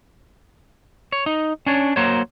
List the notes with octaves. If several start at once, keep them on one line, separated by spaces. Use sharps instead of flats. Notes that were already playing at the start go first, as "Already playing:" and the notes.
C#5
D#4
C#4 D4 C#5
F#3 A#3 F#4 C5 C#5